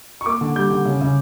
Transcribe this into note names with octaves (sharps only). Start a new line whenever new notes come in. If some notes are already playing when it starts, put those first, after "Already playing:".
C#6
A#3 D6
D3
G3 G6
D3
C#3
C#3